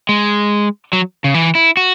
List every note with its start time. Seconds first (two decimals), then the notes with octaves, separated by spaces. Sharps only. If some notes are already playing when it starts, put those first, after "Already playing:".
0.09 G#3
0.93 F#3
1.24 C#3
1.34 E3
1.55 E4
1.77 F#4